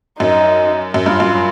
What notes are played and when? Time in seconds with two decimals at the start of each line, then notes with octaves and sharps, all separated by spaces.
0.19 F#2 D#4
0.94 F#2
1.06 G2 F4
1.20 F#2